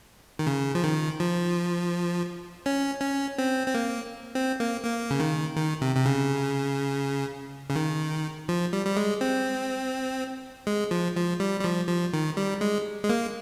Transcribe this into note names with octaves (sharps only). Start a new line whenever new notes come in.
D#3
C#3
F3
D#3
F3
C#4
C#4
C4
C4
A#3
C4
A#3
A#3
C#3
D#3
D#3
C3
C3
C#3
C#3
D#3
F3
G3
G3
G#3
C4
G#3
F3
F3
G3
G3
F3
F3
D#3
G3
G#3
G#3
A#3